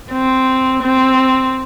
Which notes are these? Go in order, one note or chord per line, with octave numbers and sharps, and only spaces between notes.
C4
C4